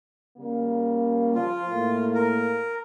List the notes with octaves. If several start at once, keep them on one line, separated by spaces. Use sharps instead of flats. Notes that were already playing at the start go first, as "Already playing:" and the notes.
C#3 G3 A#3
F3 F4
A2 A#3
A#4